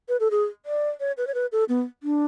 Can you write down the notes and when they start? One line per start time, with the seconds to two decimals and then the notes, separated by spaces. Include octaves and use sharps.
0.09 B4
0.20 A4
0.31 G#4
0.66 D5
1.00 C#5
1.17 B4
1.27 C#5
1.34 B4
1.52 A4
1.69 B3
2.03 D4